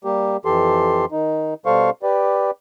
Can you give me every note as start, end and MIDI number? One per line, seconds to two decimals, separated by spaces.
0.04 0.37 55
0.04 0.37 58
0.04 0.37 67
0.45 1.05 41
0.45 1.05 52
0.45 1.05 67
0.45 1.05 69
0.45 1.05 84
1.12 1.54 51
1.12 1.54 63
1.66 1.90 47
1.66 1.90 55
1.66 1.90 69
1.66 1.90 72
1.66 1.90 77
1.66 1.90 85
2.03 2.51 67
2.03 2.51 71
2.03 2.51 74